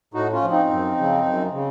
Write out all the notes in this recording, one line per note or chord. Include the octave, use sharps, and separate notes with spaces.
A2 D#4 F#4
C#4 F4
F3
C4 D#4
F#2
C#3 F3
F#2
C#3